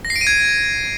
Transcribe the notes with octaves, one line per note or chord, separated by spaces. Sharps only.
A#6
C7
D7
D#7
G#6